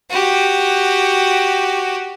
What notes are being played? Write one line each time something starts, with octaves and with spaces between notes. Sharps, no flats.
F#4 G4